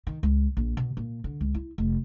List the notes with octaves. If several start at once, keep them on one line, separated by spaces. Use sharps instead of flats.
D#3
C#2
A#1
B2
A#2
D3
C#2
E4
F1